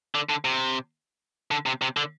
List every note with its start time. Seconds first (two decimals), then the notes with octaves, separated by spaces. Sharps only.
0.15 D3
0.29 D3
0.45 C3
1.51 D3
1.66 C3
1.82 C3
1.97 D3